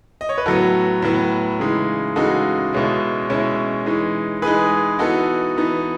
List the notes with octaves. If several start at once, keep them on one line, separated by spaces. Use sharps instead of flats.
D#5
C#5
B4
A2 F#3 B3 F#4 A4
A2 F#3 B3
C#3 E3 G#3 D#4
C#3 E3 G#3 D#4 F#4 A4
B2 G#3 C#4 E4
B2 G#3 C#4 E4
E3 G#3 D#4
E3 G#3 D#4 G#4 B4
E3 B3 D#4 F#4 A4
E3 B3 D#4